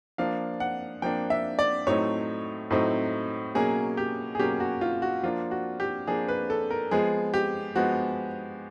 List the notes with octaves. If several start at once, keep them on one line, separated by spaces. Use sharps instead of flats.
F3 A#3 D4 F5
F#5
F3 A#3 D4 G5
E5
D5
A2 F#3 A3 C4 D#4 C#5
A2 F#3 A3 C4 D#4
B2 F#3 A#3 C#4 G#4
G4
G#4
B2 F#3 A#3 C#4 G4
F#4
F4
F#4
F3 A#3 D4 F4
F#4
G4
F3 A#3 D4 G#4
B4
A4
A#4
F3 G#3 B3 G#4
G4
F3 G#3 B3 F#4